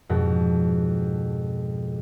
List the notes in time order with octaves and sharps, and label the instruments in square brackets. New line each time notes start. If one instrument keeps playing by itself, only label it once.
[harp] F2 G#2 B2